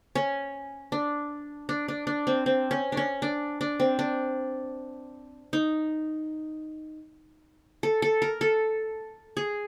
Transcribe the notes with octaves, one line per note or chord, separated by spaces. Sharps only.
C#4
D4
D4
D4
D4
C4
C4
C#4
C#4 D4
D4
D4
C4
D4
D#4
A4
A4
A#4
A4
G#4